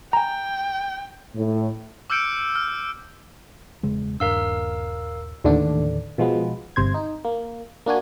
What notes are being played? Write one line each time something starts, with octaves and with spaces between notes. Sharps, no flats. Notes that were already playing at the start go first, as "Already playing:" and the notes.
G5 G#5 A#5
A2
D6 E6 F6 G6 C#7 D7
F6
E1 C#3 G#3
D#1 G2 D4 A#4 F5 E6
D#2 A2 D3 E3 D4
B2 F3 G#3 B3
G1 C3 C5 G#6
D#4
A#3
A#3 D4 F#4 G#5